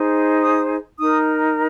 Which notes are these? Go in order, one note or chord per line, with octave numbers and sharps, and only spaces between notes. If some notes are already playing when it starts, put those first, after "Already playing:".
Already playing: D#4 G#4 C5
D#6
D#4 A#4 D#6